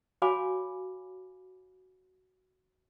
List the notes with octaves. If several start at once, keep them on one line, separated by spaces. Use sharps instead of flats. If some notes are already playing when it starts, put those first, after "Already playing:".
F#4 C#5 F5 G#5 B5 D6